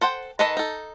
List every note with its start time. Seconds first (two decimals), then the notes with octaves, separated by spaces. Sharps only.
0.01 A4 C5 F#5 G5
0.39 D#3 D#4 A4 B4 D#5
0.57 D#4 A4